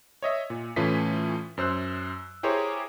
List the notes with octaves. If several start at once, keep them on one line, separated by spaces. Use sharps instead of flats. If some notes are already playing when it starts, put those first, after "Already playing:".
C#5 D#5 E5
A#2
A2 E3 A3 C#4 F4 B6
F#2 C5 E6 F#6
E4 G4 G#4 A#4 C5 C#5